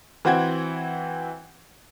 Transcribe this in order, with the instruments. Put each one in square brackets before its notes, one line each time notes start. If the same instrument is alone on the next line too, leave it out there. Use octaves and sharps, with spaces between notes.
[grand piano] E3 C4 F#4 F#5 G5 G#6